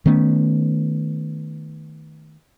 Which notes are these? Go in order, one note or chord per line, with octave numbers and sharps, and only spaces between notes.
D#3 A3 B3 C#4